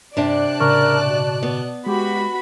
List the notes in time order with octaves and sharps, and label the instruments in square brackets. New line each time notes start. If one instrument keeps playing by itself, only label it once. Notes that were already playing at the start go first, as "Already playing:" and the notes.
[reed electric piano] G2 [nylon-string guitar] C3 D4 [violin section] D5 A5 F#6
[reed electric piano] A2 C#3 C#6 [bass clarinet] A#4
[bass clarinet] B2
[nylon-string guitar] B3
[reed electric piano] G#3 [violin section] F#4 B5 [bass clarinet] G4